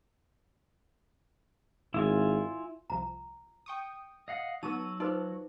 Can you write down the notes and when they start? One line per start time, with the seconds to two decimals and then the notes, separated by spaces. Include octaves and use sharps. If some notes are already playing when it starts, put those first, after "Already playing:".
1.94 G#1 E4 F4 G#5
2.90 C2 F3 A#5
3.66 G5 C#6 D#6
4.28 D#5 F5 F#5
4.63 F#3 B3 D#4 C#6 E6 D#7
5.00 D#4 F4 B4 C5 D5